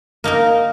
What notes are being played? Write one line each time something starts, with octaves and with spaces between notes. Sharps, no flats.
A#3 D#4 A#4